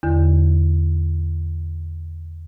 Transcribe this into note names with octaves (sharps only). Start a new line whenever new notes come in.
E2 D3